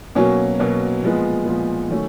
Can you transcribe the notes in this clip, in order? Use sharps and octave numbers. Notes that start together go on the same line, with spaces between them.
B2 F#3 A#3 C#4
B2 F#3 A#3 C#4
A#2 F3 G#3 B3
A#2 F3 G#3 B3
D#3 F#3 A3 C#4